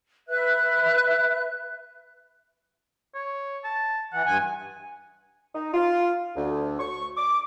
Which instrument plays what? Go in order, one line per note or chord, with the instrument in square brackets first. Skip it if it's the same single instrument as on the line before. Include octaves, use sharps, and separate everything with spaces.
[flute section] B4 E5 F#6
[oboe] C#5
A5
[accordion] E3 [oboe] F#5
[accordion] G2 G#5
[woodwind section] D#4
F4
D2
C#6
D6